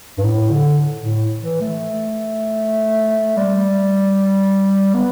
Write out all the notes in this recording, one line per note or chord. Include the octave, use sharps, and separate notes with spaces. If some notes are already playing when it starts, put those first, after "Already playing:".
G2
A2
D3
A2
E3
A3
G3
B3